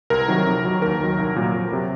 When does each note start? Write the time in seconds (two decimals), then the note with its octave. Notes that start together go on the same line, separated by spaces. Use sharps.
0.10 C2 A#4
0.28 C3 D#3 F#3
0.47 F2
0.64 D#3 F#3
0.82 D#2 A#4
1.00 D#3 F#3
1.18 C2
1.36 A#2 F#3
1.54 F2
1.72 C3 F#3